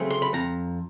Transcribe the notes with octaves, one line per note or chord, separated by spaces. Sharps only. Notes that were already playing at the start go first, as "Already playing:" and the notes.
Already playing: C#3 F#3 A3 C4
C6
B5
F2 A#5